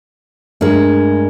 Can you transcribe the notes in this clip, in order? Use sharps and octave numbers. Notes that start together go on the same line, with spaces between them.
G2 G#3 A3 D4 A#4